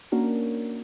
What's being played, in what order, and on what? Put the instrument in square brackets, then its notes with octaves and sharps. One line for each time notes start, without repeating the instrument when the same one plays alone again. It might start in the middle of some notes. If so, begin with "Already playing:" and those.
[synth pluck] A#3 C#4 D4 F#4 A#4